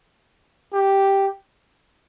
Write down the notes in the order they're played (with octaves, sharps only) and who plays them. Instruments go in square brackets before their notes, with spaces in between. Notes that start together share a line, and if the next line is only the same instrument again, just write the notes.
[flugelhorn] G4